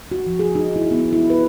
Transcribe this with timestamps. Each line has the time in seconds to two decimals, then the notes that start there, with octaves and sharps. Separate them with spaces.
0.12 F#4
0.26 F3
0.39 G#4
0.55 D#4
0.76 E4
0.91 B3
1.13 E4
1.30 B4